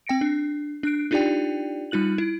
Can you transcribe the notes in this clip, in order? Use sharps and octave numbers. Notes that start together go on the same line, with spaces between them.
C4 G5 A#6 C#7 D7
D4
D4 F#6 D7
D4 D#4 F4 G4 D5 G5
G3 D#4 F4 F#6 F#7
E4